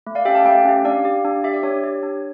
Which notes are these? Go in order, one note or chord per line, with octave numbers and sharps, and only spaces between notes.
A3
D5 F5
C#4 G4 E5 G5
F5 A5
A3 E5 G5
C#4 G4
D4 D5 F5
G4
D4
G4 E5
D5
D4 C#5
G4
D4